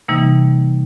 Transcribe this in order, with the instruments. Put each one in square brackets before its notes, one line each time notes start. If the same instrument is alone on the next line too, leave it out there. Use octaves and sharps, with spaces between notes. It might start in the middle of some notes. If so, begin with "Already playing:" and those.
[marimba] C3 E3 G3 A#3 D#4